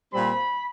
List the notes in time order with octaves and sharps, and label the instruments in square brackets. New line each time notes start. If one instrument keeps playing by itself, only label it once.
[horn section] A#2 G3 C4 B5